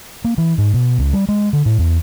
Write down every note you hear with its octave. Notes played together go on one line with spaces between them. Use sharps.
A#3
E3
G#2
B2
C#2
G3
G#3
D3
A2
E2